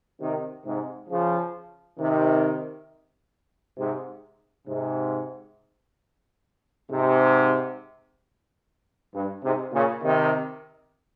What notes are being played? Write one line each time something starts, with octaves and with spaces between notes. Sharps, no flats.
C3 D#3
G#2 C3
C#3 F3
C3 D#3
G#2 C3
G#2 C3
G#2 C3
G2
G#2 C3
A#2 C#3
C3 D#3